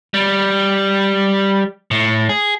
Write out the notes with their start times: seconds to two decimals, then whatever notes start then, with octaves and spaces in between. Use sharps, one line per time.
0.14 G3
1.91 A2
2.29 G#4